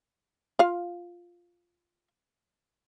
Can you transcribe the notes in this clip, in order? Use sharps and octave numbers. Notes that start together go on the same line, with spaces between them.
F4 F5